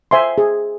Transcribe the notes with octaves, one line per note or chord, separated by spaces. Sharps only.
C5 E5 G#5 C6
G#4